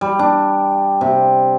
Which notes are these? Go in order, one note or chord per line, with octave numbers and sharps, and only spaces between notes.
G3
D4
C3